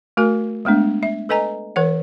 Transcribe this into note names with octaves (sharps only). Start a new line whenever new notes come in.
A3 F#4 A#4 G#5
G#3 A3 B3 D4
E5
A4 B4 D#5 G#5 A#5
E3 A#4 C#5 F#5